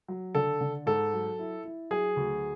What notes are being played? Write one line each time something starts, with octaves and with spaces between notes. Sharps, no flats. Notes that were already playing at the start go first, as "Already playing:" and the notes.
F#3
D3 A4
D3
G#2 A4
F#3
E4
E4
F#3 G#4
D2